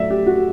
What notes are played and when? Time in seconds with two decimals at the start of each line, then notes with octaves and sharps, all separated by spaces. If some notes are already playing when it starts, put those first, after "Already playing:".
Already playing: A2 F#3 A3 D5 E5
0.10 G4
0.26 F#4